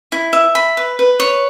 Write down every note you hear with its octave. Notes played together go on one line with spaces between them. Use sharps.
E4
E5
B5
B4
B4
C#5